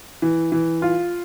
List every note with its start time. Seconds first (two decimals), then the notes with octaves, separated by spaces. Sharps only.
0.22 E3
0.52 E3
0.82 F4